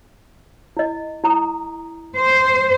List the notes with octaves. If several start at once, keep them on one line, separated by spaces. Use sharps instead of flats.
E4 D#5
E4 A#5 D#6
C5